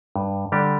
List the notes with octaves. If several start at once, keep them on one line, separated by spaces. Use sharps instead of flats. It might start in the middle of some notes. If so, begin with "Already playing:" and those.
G2
D3 G3 D4 G4